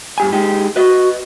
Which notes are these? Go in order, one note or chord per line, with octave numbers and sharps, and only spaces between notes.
G2 G4 G#5
G#3 D#4 G4
F#4 B4 D#5